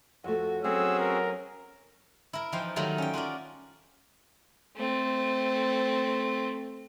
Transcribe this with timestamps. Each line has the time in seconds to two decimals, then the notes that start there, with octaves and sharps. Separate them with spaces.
0.24 F2 A3 F#4
0.64 F#3 A3 C4 C#4 F#4 G#4 E6
0.99 A#4
2.33 E4 A#4
2.52 E3 F3 D#4 G5 C6
2.76 D#3 F#3 G3 A3 D#4 F4
2.98 C#4 G5
3.13 F4 F#4 A#4 D5
4.77 A3 C4